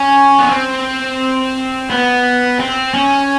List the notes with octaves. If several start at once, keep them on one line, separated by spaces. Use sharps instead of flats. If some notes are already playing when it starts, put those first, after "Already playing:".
Already playing: C#4
B3
C4
B3
C4
C#4